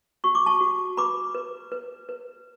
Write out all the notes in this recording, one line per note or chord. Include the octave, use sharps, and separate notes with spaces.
F#4 C#6
D6
A5 C#6
F#4
B4 B5 D6
B4
B4
B4